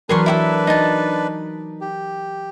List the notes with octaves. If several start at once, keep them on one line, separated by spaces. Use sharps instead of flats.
E3 F#3 D4 G#4 A#4 B4 C6 C#6
E4 G4 A4
D#4 A5
G4